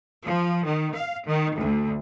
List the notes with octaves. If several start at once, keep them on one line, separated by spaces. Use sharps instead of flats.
F3
D#3
F5
D#3
D2